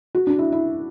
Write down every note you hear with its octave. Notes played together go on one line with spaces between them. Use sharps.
F#4
D4
E4
E4